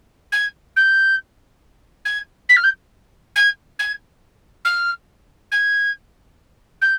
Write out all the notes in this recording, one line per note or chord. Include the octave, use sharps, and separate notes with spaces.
G#6
G6
G#6
B6
F6
G6
G#6
G#6
F6
G#6
G6